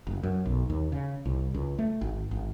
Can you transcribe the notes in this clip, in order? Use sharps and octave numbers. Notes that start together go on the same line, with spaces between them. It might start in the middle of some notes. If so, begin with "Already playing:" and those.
F#1
F#2
B1
D#2
C#3
C2
C#2
A3
G#1
G#1